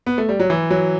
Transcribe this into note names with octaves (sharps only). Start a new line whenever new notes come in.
B3
A3
G3
F#3
E3
F#3